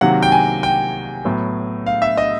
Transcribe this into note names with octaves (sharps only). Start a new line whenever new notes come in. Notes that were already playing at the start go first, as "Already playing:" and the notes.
C3 D#3 F#3 A#3 F#5
G5
G#5
G5
A2 F#3 B3
F5
E5
D#5